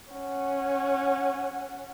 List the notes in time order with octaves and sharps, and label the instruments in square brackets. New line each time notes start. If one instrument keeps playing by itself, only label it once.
[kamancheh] C#4 F#5